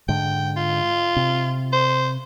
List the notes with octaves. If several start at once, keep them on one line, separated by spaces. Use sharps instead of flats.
G#2 D3 G5
F4
C3
C5